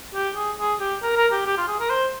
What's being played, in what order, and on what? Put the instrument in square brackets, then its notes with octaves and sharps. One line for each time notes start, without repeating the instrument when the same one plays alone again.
[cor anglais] G4
G#4
G#4
G4
A#4
A#4
G4
G4
F4
G#4
A#4
C5